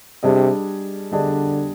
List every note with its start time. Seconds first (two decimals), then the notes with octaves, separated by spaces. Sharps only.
0.23 C3 G3 D4 G#4 D#5
1.12 D3 G3 D4 G#4 D#5